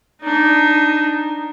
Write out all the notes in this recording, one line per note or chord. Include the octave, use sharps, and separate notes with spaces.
D4 D#4